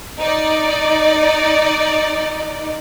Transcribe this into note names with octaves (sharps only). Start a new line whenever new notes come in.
D#4 D5